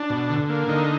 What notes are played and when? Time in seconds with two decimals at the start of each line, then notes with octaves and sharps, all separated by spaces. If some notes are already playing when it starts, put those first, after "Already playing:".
Already playing: D4
0.10 B2
0.29 D3
0.49 A#3
0.68 D3 D#4